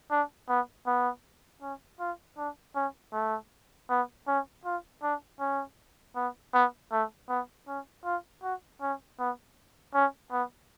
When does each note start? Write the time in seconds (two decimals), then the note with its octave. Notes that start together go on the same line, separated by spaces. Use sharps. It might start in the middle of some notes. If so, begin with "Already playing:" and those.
0.11 D4
0.49 B3
0.86 B3
1.62 C#4
2.00 F4
2.37 D4
2.75 C#4
3.13 A3
3.90 B3
4.27 C#4
4.65 F4
5.02 D4
5.40 C#4
6.16 B3
6.54 B3
6.92 A3
7.29 B3
7.68 C#4
8.05 F4
8.43 F#4
8.81 C#4
9.19 B3
9.94 C#4
10.31 B3